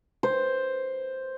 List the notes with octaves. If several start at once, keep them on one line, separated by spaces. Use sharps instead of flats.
C5